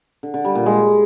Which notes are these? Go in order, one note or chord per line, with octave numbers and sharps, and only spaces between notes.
D3
D3
G3
A#2
G#3